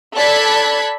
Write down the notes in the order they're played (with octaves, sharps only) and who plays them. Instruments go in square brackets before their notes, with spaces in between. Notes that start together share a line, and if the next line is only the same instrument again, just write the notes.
[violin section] A4 D5 B5 F#6 G#6 B6